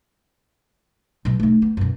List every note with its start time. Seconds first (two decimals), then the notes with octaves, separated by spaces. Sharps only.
1.25 B2 F#3
1.40 A3 D#4
1.62 B3
1.77 F#2 B2